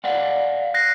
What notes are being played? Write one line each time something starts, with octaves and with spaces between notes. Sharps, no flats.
D5 F5 F#5
F#6 A#6 C7